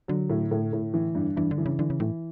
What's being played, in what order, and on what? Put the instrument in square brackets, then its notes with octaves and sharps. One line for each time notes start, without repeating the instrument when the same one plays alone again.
[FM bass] D3 [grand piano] F#3
[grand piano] A2
A2
A2
E3
G2
[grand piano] G2 [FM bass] E3
[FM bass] D3
[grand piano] E3
[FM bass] C#3
[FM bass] D3 [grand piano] E3
[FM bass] C#3
[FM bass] A2 [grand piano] E3